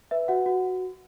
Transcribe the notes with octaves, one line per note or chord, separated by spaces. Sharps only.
B4 E5
F#4 F#5
F#4